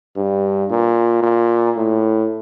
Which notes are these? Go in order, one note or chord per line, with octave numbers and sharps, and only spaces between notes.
G2
A#2
A#2
A2